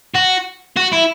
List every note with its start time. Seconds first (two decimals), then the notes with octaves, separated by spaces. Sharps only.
0.15 F#4
0.77 F#4
0.93 E4